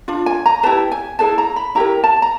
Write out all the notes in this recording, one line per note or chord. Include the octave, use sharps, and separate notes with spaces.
D4 F4
G#5
A#5
E4 G4 B4 A5
G#5
E4 G#4 B4 A5
A#5
B5
E4 G4 A#4 A#5
A5
A#5